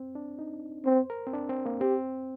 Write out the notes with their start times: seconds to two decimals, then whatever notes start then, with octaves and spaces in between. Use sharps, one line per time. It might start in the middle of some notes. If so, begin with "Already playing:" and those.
Already playing: C4
0.15 D4
0.39 D#4
0.86 C4 C5
1.10 A#4
1.27 C4
1.33 D4
1.49 C4
1.66 A#3
1.81 C4 G4